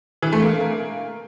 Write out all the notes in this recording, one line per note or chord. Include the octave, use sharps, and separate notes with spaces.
E3
A3
A#3